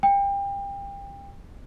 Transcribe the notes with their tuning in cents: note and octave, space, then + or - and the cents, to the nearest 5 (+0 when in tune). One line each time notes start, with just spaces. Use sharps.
G5 +30